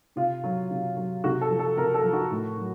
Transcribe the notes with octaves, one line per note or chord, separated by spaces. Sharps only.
C3 F4
F#3
C3
F#3
C3 F#4
A4
F3
A4
C3 A#4
A4
F3
F#4
A2
F#3